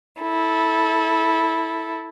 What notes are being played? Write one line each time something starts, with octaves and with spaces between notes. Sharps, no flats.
E4 A4